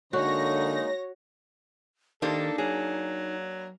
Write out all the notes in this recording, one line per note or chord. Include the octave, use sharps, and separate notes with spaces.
D3 G#3 A#3 D#4 F#4 C#5 A#6
D#3 A#3 D4 D#4 G4 A4 C5
F#3 G#4